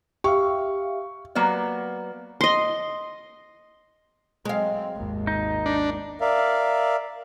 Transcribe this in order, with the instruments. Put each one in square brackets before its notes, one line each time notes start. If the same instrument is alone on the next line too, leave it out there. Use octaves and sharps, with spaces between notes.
[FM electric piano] G4 E5 F5 [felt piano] C#6
[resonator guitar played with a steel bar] F#3 A#3 B3 D5
[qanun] D#5 C6
[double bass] F#3 C4 [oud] G#3 F5
[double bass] G#1 D#2
[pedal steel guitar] D#4
[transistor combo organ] D4
[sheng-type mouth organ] A#4 D5 E5 F5